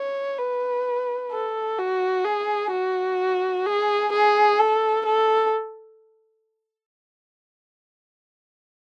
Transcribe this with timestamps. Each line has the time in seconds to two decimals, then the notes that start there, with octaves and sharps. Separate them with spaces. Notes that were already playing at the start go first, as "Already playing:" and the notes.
Already playing: C#5
0.39 B4
1.32 A4
1.78 F#4
2.25 G#4
2.72 F#4
3.67 G#4
4.12 G#4
4.59 A4
5.06 A4